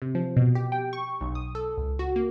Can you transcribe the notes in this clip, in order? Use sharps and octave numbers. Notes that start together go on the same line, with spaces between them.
C3
F3
B2
G4
G5
C#6
B1
D#6
A4
C#2
F#4
A#3